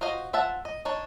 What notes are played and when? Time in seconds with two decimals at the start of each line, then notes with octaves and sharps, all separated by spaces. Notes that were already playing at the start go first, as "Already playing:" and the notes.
0.01 F4 F#4 C5 D#5
0.33 F3 E5 F#5 A5
0.65 D#5
0.85 D4 D#4 C#5